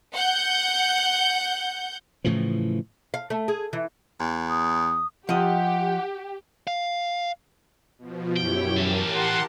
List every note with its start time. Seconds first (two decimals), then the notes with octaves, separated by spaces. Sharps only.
0.14 F#5 G6
2.24 A2 C#3 E3 F3
3.14 F5
3.30 A3
3.48 G#4
3.73 E3
4.20 E2
4.50 D#6
5.29 F3 G4 D#5 F#5
6.67 F5
7.98 B2 F3
8.37 F#2 E4 G4 C#5 G5
8.76 E3 G4 A4 A#4 A5
9.14 F#5 C6